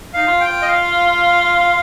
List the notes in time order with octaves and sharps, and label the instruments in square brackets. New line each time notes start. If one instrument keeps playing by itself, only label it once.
[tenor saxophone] D#4 [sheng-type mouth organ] F5
[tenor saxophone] F4
[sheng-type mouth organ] G5
[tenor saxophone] F4
[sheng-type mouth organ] D#5
F5